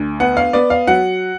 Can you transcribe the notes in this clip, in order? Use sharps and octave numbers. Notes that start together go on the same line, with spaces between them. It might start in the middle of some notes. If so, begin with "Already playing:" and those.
Already playing: D2
B3 F#5
F5
B3 D5
F5
F#3 F#5